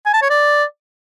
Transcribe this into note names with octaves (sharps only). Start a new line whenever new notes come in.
G#5
A5
C#5
D5